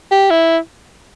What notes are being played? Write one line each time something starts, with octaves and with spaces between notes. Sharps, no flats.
G4
E4